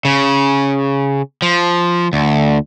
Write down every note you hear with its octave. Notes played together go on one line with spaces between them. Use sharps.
C#3
F3
D2